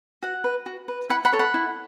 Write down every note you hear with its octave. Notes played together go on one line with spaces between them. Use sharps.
F#4 F#5
B4
F#4
B4
E4 F#5 B5
F#5 B5
A4 C#5
F#5 B5
E4